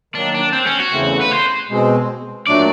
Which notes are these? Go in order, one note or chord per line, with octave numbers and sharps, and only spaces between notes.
D#3 F#3 A#3 D4
D4
C4
C#4
F#4
E2 C#3 E3 A3 C4
B4
C5
B2 G#3 C4
A#2 F#3 A3 D4 F#4 D5